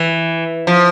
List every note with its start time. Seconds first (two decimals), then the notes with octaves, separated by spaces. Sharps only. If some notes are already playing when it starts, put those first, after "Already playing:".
Already playing: E3
0.67 F3